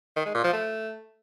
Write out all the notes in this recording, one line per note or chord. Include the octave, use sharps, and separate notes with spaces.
D#3
G#3
A#2
F3
A3